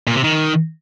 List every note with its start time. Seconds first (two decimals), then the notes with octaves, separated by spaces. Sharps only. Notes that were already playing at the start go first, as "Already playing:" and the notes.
0.07 A#2
0.15 C3
0.24 D#3